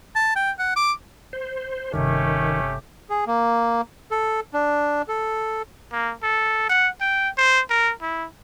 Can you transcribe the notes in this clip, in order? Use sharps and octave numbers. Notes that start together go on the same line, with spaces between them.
A5
G5
F#5
D6
C5
G1 C3 D#3 A3 C#4 G4
G#4
A#3
A4
D4
A4
A#3
A4
F#5
G5
C5
A#4
E4